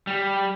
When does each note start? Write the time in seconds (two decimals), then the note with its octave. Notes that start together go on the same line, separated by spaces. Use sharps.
0.07 G3